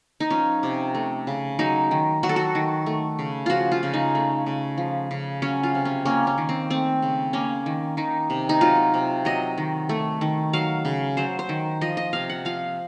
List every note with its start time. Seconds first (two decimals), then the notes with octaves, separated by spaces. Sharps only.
0.20 D#4
0.31 F3 C#4
0.63 C3
0.95 A3
1.27 C#3
1.59 F#3 D#4
1.91 D#3
2.23 F#3 F#4
2.29 A4
2.36 F#4
2.55 D#3
2.86 A3
3.19 C#3
3.46 F3 F4 F#4
3.72 F4
3.83 C#3
3.94 D#4
4.15 A3
4.46 C#3
4.78 F3
5.11 C#3
5.42 F#3 C#4
5.63 F4
5.75 C3
5.85 C#4
6.05 A#3 C#4
6.27 C#4
6.38 D#3
6.49 C4
6.70 A3 C4
7.02 C#3
7.33 A#3 C#4
7.66 D#3
7.97 D#3 D#4
8.30 C3
8.49 D#4
8.61 F#3 F4
8.94 C3
9.25 F#3 D#5
9.58 D#3
9.89 A3
10.21 D#3
10.53 F#3 F5
10.85 C#3
11.17 F#3 C5
11.39 C5
11.49 D#3
11.81 F3 D#5
11.97 D#5
12.13 C3 F5
12.30 F#5
12.45 F3 F5